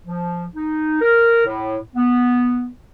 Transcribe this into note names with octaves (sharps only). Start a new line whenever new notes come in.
F3
D#4
A#4
A2
B3